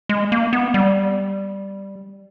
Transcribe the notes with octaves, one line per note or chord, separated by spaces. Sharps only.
G#3
A#3
B3
G3